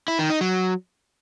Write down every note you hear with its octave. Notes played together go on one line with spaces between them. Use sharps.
E4
D#3
D#4
F#3